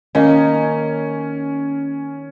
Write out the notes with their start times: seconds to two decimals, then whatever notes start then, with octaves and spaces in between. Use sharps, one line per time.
0.15 D#3 A#3 C#4 D#4